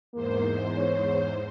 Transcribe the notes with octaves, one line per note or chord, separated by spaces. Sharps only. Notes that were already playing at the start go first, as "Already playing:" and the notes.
E2 G#2 A#3 C5
C#5